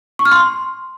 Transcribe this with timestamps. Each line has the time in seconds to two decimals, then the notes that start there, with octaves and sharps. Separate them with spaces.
0.19 C#6
0.25 F6
0.32 C6